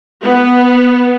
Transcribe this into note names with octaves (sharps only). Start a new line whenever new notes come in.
B3